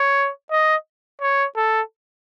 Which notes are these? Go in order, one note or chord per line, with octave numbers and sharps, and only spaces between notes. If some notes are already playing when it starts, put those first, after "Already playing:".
Already playing: C#5
D#5
C#5
A4